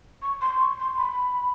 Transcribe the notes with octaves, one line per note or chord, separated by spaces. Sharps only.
C#6
C6
C#6
C6
B5